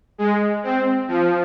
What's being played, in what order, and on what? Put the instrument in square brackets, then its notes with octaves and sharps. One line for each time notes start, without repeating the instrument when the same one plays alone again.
[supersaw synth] G#3
C4
F3